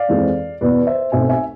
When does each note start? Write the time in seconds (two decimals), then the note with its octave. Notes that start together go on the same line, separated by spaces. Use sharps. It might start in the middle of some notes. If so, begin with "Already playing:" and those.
Already playing: D5 F5
0.09 F2 E3 G#3 C4
0.61 E2 B2 B3 B4 D5
0.86 C5 E5
1.12 B1 B2 A3 C4 E5 G#5
1.29 E5 G#5